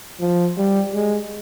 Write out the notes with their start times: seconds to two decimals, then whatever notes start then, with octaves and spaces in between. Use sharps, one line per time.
0.20 F3
0.57 G3
0.94 G#3